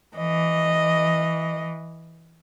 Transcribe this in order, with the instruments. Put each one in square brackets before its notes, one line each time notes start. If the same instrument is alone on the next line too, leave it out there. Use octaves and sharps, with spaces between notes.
[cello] E3 [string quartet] D#5